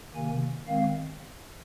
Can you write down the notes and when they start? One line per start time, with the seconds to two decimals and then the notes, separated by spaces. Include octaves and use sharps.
0.14 C3 D#3 A#3 G#5
0.67 D#3 G#3 C4 F5